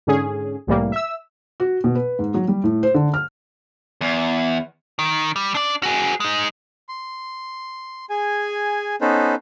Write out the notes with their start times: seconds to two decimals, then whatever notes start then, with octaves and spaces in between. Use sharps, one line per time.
0.07 G#2 D3 C#4 G#4
0.67 C2 A2 E3 G3 A#3
0.92 E5 E6
1.60 F#4
1.84 B2
1.95 B4
2.19 G#2
2.34 F#3
2.48 G3
2.64 A2
2.83 C5
2.94 D3
3.14 F6
4.01 E2
4.99 D#3
5.36 G3
5.55 D4 D5
5.83 F#4 G#4
6.20 G#3 D#4
6.89 C6
8.10 G#4 G#5
9.01 B3 C#4 D#4 A4 B4 C5